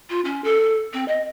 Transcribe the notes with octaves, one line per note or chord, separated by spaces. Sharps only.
F4
C#4
A4
C4
D#5